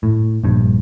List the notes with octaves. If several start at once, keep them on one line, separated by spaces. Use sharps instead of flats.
A2
A#1 G2